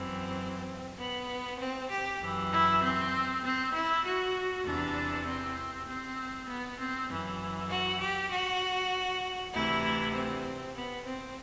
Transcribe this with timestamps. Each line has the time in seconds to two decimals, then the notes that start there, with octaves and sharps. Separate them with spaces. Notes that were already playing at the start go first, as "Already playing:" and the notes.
Already playing: F#2 E3 C4
0.98 B3
1.59 C4
1.89 G4
2.20 F#2 E3
2.51 E4
2.81 C4
3.43 C4
3.73 E4
4.03 F#4
4.64 E2 C3 E3 D4
5.26 C4
5.87 C4
6.48 B3
6.78 C4
7.09 F#2 E3
7.70 F#4
8.00 G4
8.30 F#4
9.53 D2 C3 E3 E4
10.14 C4
10.75 B3
11.06 C4